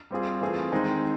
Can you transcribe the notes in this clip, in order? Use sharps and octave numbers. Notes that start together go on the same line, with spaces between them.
G3 C4 F4 G#4
E3 A3 C4 F4 G#4
D#3 G#3 C4 D#4 G#4